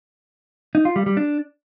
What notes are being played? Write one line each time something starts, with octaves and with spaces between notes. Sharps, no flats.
D#4
F4
G3
G3
D4